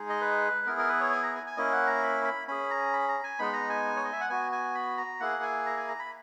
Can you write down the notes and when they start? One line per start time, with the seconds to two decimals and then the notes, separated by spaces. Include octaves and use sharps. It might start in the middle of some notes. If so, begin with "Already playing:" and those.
Already playing: G#3 D#4 G#4
0.10 D#5
0.21 B4
0.66 B3 E4 G#4 A#4
0.78 A#4
0.89 B4
1.01 C#5
1.12 G#5
1.23 A#5
1.35 G#5
1.46 G#5
1.57 A#3 C#4 E4 D#5
1.72 F#5
1.87 A#5
2.03 B5
2.25 B5
2.48 C#4 G#4 B5
2.71 A#5
2.93 B5
3.08 A#5
3.24 G#5
3.39 G#3 B3 D#4 B5
3.53 A#5
3.69 G#5
3.96 C#5
4.05 D#5
4.13 E5
4.21 F#5
4.29 B3 F#4 G#5
4.52 G#5
4.75 B5
4.97 A#5
5.20 A#3 E4 G#4 F#5
5.43 G#5
5.66 A#5
5.77 G#5
5.88 A#5
5.99 B5